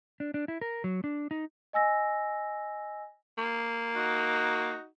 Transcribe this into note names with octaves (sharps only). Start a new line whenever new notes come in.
D4
D4
E4
A#4
F#3
D4
D#4
D#5 G#5 E6 A#6
A#3
D#4 F#4